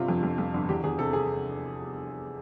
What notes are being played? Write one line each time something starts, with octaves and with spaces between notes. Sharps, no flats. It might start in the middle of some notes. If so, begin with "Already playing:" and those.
Already playing: G1 C3 F4
F2
F2
F2
G1
E2 G4
E2 G#4
C3 A4
C3 G#4